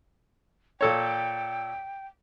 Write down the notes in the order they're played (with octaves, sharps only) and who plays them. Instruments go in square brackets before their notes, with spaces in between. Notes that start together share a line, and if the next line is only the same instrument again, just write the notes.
[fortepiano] A#2 A4 C#5 [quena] G5